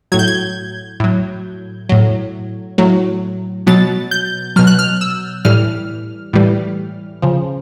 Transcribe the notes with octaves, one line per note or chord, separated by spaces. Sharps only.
A2 F#3 G#6
G6
G#6
A2 F#3
A2 F#3
A2 F#3
B2 F#3 A6
G6
B2 F#3 F6
F#6
F6
E6
A2 E3 G3 F6
A2 E3 G3
C#3 F3